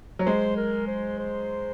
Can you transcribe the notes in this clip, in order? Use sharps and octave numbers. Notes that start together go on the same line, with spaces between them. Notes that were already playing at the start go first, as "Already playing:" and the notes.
F#3
G#3 C5
A#4
C5
C5